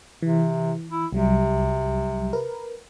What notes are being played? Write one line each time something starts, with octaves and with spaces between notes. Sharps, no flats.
C3 E3
E4
C2 C3 F#3 G3
A#4 B4